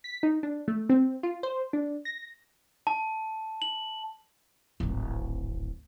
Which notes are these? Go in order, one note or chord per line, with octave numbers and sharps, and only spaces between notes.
B6
D#4
D4
A3
C4
F4
C5
D4
A#6
A5
F#7
D1 G#1